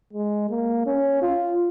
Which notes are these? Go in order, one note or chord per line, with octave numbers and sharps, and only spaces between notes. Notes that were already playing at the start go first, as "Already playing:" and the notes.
G#3
A#3
C#4
F4